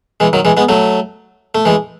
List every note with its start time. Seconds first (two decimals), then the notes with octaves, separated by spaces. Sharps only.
0.20 E3 G#3
0.33 D#3 F#3
0.45 E3 G#3
0.57 G#3 B3
0.69 F#3 A3
1.55 A3
1.65 E3 G#3